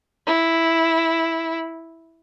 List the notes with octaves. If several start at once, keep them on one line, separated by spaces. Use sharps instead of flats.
E4